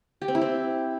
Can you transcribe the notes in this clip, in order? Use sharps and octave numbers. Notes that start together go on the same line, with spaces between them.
G4
C4
E4
C4